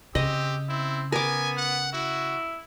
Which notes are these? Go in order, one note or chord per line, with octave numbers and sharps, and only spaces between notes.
C#3 C4 G4 D#5
C4 E4
B3 A#4 G#5 D6
F#5
E4 F#4